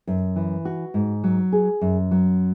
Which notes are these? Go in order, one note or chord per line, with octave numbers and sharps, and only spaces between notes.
F#2
E3
F#4
G#2
F#3
G#4
F#2
F#3